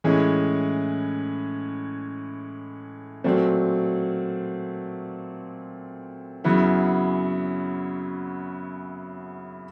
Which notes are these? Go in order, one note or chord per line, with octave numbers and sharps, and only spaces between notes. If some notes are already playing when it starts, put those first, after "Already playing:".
A2 E3 G#3 C#4
A#2 F#3 A3 C4
F#2 C#3 F#3 B3 E4